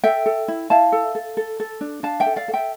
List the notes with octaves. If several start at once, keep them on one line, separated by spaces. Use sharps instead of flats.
A4 E5 G5
A4
E4
E4 F5 A5
A4
A4
A4
A4
D4
D4 F5 A5
E5 G5
A4
D5 F5
A4
E5 G5